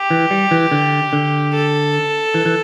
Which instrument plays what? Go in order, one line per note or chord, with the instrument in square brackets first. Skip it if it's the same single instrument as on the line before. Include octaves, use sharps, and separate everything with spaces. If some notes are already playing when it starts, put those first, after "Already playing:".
Already playing: [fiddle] G4
[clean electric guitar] E3
G3
E3
D3
D3
[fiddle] A4
[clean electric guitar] E3
E3